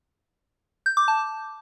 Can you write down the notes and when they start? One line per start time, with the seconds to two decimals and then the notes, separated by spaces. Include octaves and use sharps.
0.86 G6
0.97 D6
1.08 A5